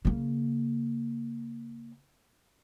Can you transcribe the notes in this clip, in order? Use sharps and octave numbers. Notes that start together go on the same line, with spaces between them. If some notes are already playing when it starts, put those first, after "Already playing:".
C#3 A#3